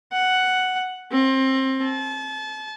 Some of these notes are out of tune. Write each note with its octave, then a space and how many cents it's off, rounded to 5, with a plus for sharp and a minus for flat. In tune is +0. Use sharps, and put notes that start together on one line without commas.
F#5 +5
C4 +25
A5 -35